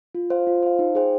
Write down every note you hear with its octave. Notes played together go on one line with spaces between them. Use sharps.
F4
C5 F5
F4
C5 F5
D#4
G#4 C5 G5